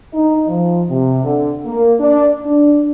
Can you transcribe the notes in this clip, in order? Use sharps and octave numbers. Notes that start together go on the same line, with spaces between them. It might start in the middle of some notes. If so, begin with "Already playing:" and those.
D#4
F3
C3
D3
A#3
D4
D4